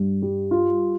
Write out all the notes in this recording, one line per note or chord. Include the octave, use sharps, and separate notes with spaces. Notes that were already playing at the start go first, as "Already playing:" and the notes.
Already playing: G2
G3
F4